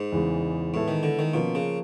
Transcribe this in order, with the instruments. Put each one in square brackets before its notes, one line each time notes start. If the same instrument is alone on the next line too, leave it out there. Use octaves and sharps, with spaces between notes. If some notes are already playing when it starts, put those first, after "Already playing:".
Already playing: [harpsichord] G#2
[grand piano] E2 C#3 E3 G#3
[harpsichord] A2 [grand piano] E3 G#3 B3 E4 A4
[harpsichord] D#3
D3
D#3
[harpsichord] B2 [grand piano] F3 A#3 C#4 F4
[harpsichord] C#3